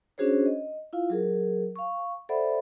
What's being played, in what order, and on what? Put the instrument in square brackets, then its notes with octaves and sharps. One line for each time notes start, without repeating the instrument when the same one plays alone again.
[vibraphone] C#4 D4 F#4 G#4 C5 C#5
D#5
E4 F4 F5
F#3 G#4 A#4
F5 C#6
A4 C5 D5 E5 F#5 B5